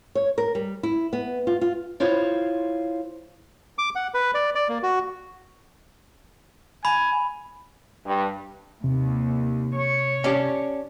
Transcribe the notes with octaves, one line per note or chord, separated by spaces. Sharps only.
C#5
A#4
G3
E4
B3
F4
F4
E4 F4 C5 C#5 F5
D6
F#5
B4
D5
D5
A#3
F#4
G#5 B5
G2
D#2 C3
C#5
C#4 D4 G4